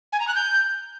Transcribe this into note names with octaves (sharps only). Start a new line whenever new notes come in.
G#5
A#5
F#6
G6